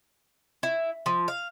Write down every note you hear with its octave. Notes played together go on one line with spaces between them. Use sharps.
E4
F3
F5